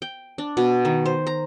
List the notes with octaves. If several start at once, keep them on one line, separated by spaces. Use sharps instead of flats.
G5
D4
B2
D#3
C5
A#5